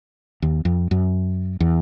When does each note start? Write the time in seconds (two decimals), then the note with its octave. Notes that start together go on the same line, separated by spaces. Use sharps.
0.42 D#2
0.65 F2
0.91 F#2
1.60 E2